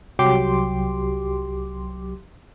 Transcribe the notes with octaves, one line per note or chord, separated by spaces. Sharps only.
C2 F#3 G4 C6 D6